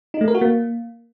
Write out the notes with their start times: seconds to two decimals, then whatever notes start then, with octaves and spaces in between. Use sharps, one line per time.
0.14 D#4
0.21 A3
0.28 A#4
0.35 F#4
0.41 A#3